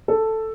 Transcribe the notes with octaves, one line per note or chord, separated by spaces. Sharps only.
A4